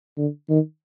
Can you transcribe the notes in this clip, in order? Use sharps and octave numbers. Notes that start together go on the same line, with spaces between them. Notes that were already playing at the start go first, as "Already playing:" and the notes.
D3
D#3